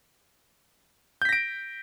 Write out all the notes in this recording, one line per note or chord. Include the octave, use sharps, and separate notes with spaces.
G6 A#6 B6 D7